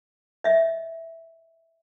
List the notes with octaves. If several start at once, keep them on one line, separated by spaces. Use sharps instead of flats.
D#5 E5